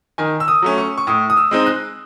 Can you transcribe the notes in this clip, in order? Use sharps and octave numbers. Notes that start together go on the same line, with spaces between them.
D#3 G#5
E6
D#6
F#3 A3 C#4
C#6
C#6
A2 D#6
D#6
E6
G#3 C4 D#4
F#6